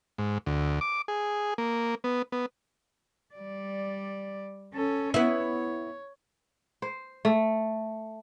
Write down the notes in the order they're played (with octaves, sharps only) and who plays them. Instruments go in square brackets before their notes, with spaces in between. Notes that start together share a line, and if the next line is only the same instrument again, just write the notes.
[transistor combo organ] G#2
D2
D6
G#4
A#3
B3
B3
[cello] G3 D5
C#4 A4
[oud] B3 E4 [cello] C#5
[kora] C5
A3